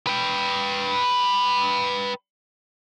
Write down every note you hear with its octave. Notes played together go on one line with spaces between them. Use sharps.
B4 G5